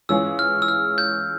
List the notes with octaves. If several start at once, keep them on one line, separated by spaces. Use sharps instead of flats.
E3 G#3 C#4 F4 G#4 E6
F6
E6
F6
G6